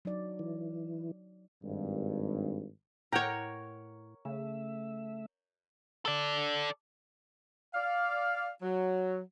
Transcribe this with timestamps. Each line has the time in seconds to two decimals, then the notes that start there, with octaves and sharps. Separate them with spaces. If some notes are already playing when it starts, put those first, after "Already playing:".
0.05 F#3 D#4 D5
0.39 E3
1.63 G#1 G2
3.12 A2 A#4 C#5 F#5 G5 A#5
4.25 C#3 A3 E5
6.05 A4 D5
7.75 D5 F5
8.62 F#3